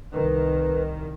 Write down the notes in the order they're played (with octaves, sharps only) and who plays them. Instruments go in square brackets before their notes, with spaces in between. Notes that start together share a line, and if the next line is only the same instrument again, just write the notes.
[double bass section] C2 D#3 [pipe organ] B4